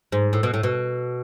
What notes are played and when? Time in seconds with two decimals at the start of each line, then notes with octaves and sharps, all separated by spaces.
0.12 G#2
0.33 A2
0.43 B2
0.54 A2
0.63 B2